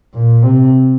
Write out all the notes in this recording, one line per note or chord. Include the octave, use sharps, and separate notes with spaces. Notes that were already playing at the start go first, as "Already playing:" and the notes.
A#2
C3